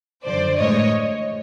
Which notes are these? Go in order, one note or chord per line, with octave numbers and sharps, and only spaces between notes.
F#2 D3 F3 C5 D5
A2 E3 G#3 C#5 D#5